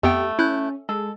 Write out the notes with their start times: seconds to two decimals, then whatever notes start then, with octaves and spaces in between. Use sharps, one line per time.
0.03 F2 A3 B3 G4 G5
0.39 C#4 E4 F#6 G6
0.89 G#3 A4